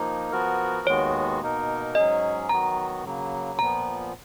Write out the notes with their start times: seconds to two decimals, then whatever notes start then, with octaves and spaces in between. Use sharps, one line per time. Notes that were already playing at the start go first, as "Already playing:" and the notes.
Already playing: F3 A#3 D#4
0.32 F3 B3 F#4 A#4
0.87 D#2 D#3 G#3 B3 F#4 C#5
1.42 B2 A#3 D#4 A#4
1.95 G#2 F#3 C#4 G#4 D#5
2.49 D#3 F#3 B3 F#4 A#5
3.05 C#3 F#3 A#3
3.59 A#2 F3 B3 A#5